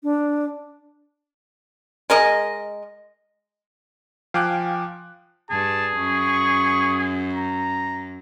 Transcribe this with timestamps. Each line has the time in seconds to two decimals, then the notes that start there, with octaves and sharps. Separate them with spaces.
0.03 D4
2.10 G#3 A#4 D#5
4.34 F3 F5 G5 G#5 D6 F#6
5.50 G2 G#4 A5
5.97 F#2 C#6
7.33 A#5